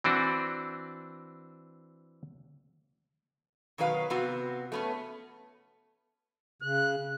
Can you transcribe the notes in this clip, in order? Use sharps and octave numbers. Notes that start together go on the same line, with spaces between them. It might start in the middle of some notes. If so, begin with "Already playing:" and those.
E3 C4 D4 F#4
B2 D#3 F#3 B4 F5
C3 B3 C4 F#4
A3 B3 C#4
C#3 F#6